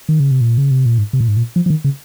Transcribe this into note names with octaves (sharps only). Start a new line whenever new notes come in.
D#3
C#3
C3
A#2
C#3
C3
A#2
G#2
C3
A#2
G#2
A#2
F3
F3
D#3
C#3